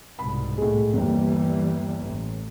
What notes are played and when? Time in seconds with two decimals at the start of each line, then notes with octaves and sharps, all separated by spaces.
0.19 C2 G#2 B2 B5
0.58 A2 G#3
0.93 G1 D#2 E3 G3
2.02 A1